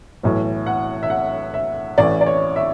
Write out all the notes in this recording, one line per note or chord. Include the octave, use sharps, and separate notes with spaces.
B1 A2 E3
F#5
E5
F#5
E5
A1 A2 E3 D5
D5
C#5
E5